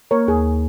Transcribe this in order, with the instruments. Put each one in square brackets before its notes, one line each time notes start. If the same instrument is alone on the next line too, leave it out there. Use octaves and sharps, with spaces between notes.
[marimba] A#3 [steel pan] A#4 C#5
[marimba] D#2 [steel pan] G#4